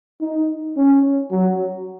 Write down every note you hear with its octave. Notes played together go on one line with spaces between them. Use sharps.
D#4
C#4
F#3